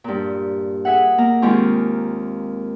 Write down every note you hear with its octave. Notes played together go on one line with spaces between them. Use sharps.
G2 A#2
G#4 E5 F#5
A#3 A#5
D#2 G#3 C4 F4 C#6